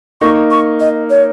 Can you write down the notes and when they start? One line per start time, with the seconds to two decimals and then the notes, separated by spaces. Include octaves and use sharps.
0.21 A#3 D#4 C#6
0.51 C#6
0.80 D#5
1.10 C#5